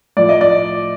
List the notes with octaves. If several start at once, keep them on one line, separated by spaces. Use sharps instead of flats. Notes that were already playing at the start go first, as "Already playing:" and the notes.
A2 F3 D5
D#5
D5